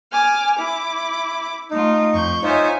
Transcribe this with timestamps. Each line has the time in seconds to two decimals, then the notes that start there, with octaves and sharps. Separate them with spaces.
0.12 G#5 D6 F6
0.56 E4 D6
1.71 A3 D#4 F4
2.13 F2 C#6 G6
2.43 D#4 F4 C5 C#5 E5 G#5